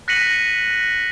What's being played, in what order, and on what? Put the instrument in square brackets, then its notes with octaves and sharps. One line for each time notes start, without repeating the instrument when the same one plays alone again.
[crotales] F#6 A#6 B6 C#7 D#7 F#7